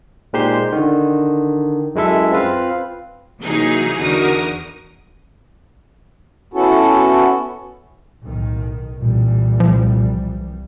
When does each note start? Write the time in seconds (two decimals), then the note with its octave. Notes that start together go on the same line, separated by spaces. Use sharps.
0.33 A#2 G#3 D#4 G4 C5 C6
0.72 D3 D#3
1.95 F#2 G#3 E4 A4 E5
2.32 C4 F4 B4 F5
3.40 C3 E3 F#3 A#3 D#4 G#4
3.99 E2 D3 D#4 F#4 A#4 D#6
6.54 B3 C#4 E4 F#4 A4
8.22 B1 A2 D#3
9.01 C2 A#2 E3 G3
9.60 F3